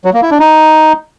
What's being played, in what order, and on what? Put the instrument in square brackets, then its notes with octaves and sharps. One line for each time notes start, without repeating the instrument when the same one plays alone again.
[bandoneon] F#3
A#3
E4
D4
D#4